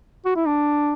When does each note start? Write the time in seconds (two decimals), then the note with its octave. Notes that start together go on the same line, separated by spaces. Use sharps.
0.25 F#4
0.36 E4
0.46 D4